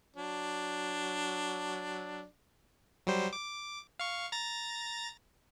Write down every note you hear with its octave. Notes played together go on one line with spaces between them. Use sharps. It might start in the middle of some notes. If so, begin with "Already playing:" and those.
F#3 D4
F#3 G3 C5
D6
F5 C#6
A#5 A6 A#6